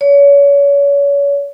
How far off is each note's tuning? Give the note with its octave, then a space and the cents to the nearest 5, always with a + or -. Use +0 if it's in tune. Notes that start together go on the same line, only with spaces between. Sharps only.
C#5 +35